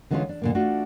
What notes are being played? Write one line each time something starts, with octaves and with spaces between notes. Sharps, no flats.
D3 E3 G#3 C4 C#4 F4
D4
A#2 D3 A#3
A3 D4 F4 F#4